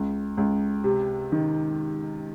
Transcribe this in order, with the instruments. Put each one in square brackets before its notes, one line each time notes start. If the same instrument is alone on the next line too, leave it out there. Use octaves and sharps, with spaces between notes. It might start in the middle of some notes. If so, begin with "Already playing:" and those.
Already playing: [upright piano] C#2
C#2
C3
D#3